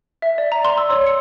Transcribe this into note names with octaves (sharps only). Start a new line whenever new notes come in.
E5
D5
A#5
C6
E6
C#5
C#7